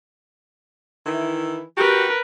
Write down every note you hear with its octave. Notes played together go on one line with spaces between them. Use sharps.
D#3 E3 E4
F#4 G4 A#4 B4